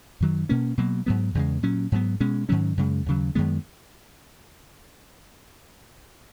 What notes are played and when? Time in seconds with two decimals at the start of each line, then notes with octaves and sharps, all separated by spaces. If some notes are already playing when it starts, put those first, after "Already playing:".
0.21 F#2 D#3 F#3
0.49 B2 A#3 C#4
0.78 B2 F#3 A#3
1.06 G#2 F#3 B3
1.35 E2 C#3 G#3
1.63 A#2 F#3 C#4
1.92 G#2 F#3 B3
2.20 B2 G#3 C#4
2.49 G#2 D#3 F#3 C#4
2.77 F#2 C#3 G#3
3.06 D#2 C#3 F#3
3.35 F#2 D#3 G#3 B3